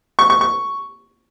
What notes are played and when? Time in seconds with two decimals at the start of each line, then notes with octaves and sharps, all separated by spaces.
0.19 C#6
0.30 C#6
0.41 C#6